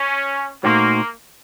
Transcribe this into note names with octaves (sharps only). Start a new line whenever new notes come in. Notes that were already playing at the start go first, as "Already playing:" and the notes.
Already playing: C#4
A#2 A3 A#3 D#4 F#4 C5